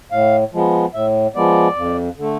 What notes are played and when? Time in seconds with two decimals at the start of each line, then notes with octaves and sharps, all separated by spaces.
0.11 A2 F5
0.53 F3 G#3 B3
0.94 A2 E5
1.35 F3 G#3 B3 D5
1.76 F2
2.17 D3 A3